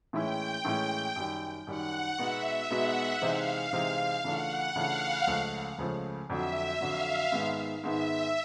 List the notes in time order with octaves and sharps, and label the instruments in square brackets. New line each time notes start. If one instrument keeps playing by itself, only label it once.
[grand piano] A2 E3 G#3 C#4 E4 [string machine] G5
[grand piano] A2 E3 G#3 C#4 E4
F#2 D#3 G3
[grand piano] F#2 D#3 G3 [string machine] F#5
[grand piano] B2 G#3 B3 D#4 F#4 [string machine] E5
[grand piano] B2 G#3 B3 D#4 F#4 [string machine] F#5
[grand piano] C3 E3 G#3 C4 D#4 [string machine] F5
[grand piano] C3 E3 G#3 C4 D#4
[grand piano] C#3 E3 A3 D4 F4 [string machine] F#5
[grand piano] C#3 E3 A3 D4 F4 [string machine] F5
[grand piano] C#2 C#3 F3 A3
C#2 C#3 F3 A3
[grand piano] F2 D3 F#3 [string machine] E5
[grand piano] F2 D3 F#3 [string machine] F5
[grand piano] G#2 D#3 G#3 B3
[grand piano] G#2 D#3 G#3 B3 [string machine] E5